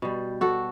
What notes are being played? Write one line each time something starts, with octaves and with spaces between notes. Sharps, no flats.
B2 G3
F#4 A4